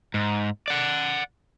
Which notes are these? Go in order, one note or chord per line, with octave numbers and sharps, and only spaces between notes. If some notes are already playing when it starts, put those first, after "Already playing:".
G#2
D5 F#5